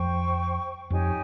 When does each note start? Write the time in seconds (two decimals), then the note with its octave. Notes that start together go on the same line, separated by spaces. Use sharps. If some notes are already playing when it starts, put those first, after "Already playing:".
Already playing: F2 C5 G5 C#6
0.90 F2 D#4 G4 C#5 G#5